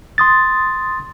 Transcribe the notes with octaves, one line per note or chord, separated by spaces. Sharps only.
C6 D#6 A6